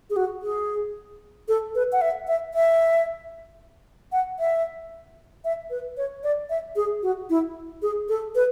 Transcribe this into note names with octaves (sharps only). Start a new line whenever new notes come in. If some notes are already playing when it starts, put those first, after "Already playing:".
G#4
F#4
G#4
A4
B4
F#5
E5
E5
E5
F#5
E5
E5
B4
C#5
D5
E5
G#4
F#4
E4
G#4
A4
B4